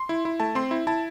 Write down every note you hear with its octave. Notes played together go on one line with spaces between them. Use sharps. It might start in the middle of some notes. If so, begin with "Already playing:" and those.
Already playing: C6
E4
E4
A3 A5
C4 C6
E4
E4 A5